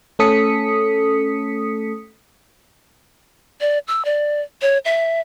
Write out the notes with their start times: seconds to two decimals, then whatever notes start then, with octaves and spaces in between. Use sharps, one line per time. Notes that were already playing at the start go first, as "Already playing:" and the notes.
0.19 A3 C#4 A4 D#6 B6 C#7
3.61 D5
3.88 E6
4.05 D5
4.62 C#5
4.85 E5